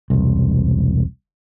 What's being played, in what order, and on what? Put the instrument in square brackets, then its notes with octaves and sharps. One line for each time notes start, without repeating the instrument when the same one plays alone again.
[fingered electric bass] E1 C2